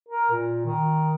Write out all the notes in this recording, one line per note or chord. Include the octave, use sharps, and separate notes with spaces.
A#4
A#2
D#3